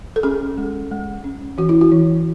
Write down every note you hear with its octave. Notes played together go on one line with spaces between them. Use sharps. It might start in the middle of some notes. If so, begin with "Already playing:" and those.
A4
C#4 G#4
G#3
G#3
C#4
E3 F#4
E4
F#4
E3